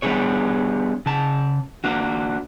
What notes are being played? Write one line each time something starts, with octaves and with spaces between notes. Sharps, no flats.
G3 B3 D4 G#4 C#5
C#3 A5
A#3 D4 F#4